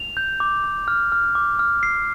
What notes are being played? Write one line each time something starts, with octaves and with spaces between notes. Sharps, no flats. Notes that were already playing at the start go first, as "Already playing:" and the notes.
Already playing: F7
G6
D6
D6
F6
F6
D6
F6
C7